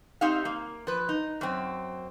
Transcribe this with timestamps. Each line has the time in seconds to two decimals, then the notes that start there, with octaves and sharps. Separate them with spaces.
0.21 C4 D#4 G4 E5 F5
0.45 A#3
0.87 F3 B4
1.09 D#4
1.41 F#2 C4